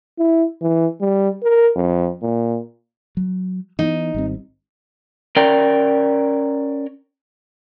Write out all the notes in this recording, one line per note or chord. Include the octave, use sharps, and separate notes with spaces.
E4
E3
G3
A#4
F2
A#2
F#3
E3 B3 D#4
G#1 G3 C4
C#4 A#4 D5 G5